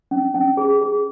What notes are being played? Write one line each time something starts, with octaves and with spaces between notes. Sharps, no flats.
C#4
C#4
G#4
G#4